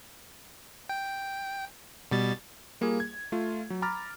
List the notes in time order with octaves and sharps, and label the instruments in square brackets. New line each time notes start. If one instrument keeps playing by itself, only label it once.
[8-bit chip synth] G5
B2 G3 A6
[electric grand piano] G3 A#3 F4 G#4
G#6
A3 F4
F#3
A#5 B5 D6 F6 A6